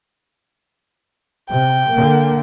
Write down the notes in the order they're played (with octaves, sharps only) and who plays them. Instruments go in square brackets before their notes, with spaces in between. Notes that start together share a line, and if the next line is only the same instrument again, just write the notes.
[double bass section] C3 [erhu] G5
[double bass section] D3 A#3